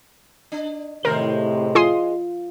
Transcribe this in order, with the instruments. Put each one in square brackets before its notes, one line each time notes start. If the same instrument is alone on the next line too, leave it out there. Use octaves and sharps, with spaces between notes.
[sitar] D4
[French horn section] A2 C3 [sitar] D#3 G#3 C5 [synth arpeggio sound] A#4
[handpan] F4 [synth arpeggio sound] G#4 C6 D#6